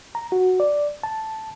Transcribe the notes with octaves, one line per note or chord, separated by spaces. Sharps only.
A#5
F#4
D5
A5